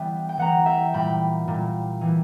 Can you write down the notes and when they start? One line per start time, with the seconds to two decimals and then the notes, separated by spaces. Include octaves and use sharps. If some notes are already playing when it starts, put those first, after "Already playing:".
Already playing: E3 G3 B3 E4 D5 E5 G5
0.29 G5
0.38 E3 G3 B3 F#5 A#5
0.66 E5 G5
0.93 A#2 G3 A#3 G5 B5
1.48 A#2 G3 A#3
2.01 E3 G3 B3